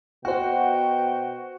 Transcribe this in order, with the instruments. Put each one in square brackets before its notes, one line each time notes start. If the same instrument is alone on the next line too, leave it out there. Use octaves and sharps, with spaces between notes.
[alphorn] B2 [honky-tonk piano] F#4 [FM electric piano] C5 F#5 [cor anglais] G5